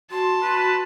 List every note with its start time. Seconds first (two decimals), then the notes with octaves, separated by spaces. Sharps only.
0.11 F#4 A5 C6
0.42 F#4 B4